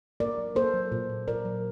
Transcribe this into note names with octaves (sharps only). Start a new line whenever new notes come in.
A#3 A#4 D5
F#3
A#3 A4 C5
F#3
A#2
A#2
A#2 A#4 D5
F#3